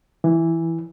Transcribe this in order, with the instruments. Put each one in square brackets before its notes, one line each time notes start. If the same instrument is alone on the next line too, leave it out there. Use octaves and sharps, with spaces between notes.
[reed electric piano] E3